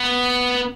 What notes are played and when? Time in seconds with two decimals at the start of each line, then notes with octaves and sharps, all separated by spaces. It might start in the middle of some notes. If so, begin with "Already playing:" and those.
Already playing: B3